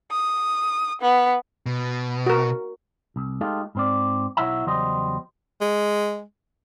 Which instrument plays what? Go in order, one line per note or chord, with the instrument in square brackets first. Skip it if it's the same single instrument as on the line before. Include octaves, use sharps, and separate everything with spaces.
[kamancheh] D#6
B3
[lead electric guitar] B2
[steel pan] F#4 A#4
[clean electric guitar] C2
G#3 A3 D#4 F4 G4 A4
G#2 C4 D5
B1 E4 C#5 E5 F#5 A#5
E2 C#3 F#3 G3 C5 D#5
[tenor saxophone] G#3